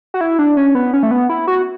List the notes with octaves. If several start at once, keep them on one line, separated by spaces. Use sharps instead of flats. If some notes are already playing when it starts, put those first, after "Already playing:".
F#4
E4
D4
C#4
B3
C#4
A3
B3
E4
F#4